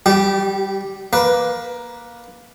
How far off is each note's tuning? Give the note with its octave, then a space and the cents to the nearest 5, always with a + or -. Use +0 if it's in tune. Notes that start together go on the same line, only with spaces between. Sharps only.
G3 +0 G4 -30
A#3 +15 B4 +0